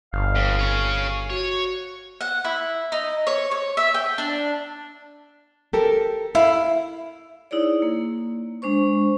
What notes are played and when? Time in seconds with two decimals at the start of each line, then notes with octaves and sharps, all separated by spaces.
0.13 G1 F5
0.35 F2
0.59 G#4 C#5
1.30 F#4 C#5
2.21 F#5
2.45 E4
2.92 D#4
3.27 C#5
3.51 C#5
3.77 E5
3.94 G5
4.18 D4
5.73 G4 A4 A#4
6.35 E4 F5
7.51 D#4 E4 G#4 C#5 D5
7.82 A#3
8.62 G#3 D4 C5 C#6